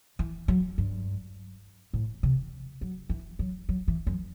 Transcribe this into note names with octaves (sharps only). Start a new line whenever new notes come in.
E3
F#3
G2
A2
C3
F#3
E3
F#3
F#3
E3
F#2